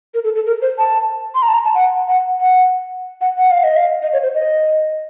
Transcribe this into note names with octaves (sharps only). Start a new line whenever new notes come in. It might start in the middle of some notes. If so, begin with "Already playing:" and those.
A#4
A4
A4
A#4
C5
A5
C6
A#5
A5
A#5
A5
F#5
F#5
F#5
F#5
F#5
F5
D#5
F5
D#5
C#5
C5
D#5